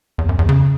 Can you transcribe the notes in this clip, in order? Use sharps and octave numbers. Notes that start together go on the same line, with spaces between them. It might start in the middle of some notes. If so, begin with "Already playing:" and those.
E2
F#2
E2
C#3